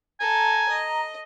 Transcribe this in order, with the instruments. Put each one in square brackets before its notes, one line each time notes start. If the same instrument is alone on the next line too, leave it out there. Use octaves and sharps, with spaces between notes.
[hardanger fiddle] A4 [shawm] G#5 [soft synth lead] A#5
[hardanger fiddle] D#5